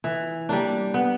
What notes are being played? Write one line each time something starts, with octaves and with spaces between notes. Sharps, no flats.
E3
G3 A#3 D4
B3